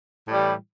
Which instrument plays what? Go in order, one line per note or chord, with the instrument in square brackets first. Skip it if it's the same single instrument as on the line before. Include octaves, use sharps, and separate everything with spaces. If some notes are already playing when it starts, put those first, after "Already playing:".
[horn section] A2 E3 G3